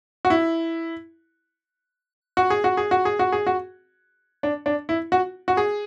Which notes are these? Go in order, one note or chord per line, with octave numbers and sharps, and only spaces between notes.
F#4
E4
F#4
G#4
F#4
G#4
F#4
G#4
F#4
G#4
F#4
D4
D4
E4
F#4
F#4
G#4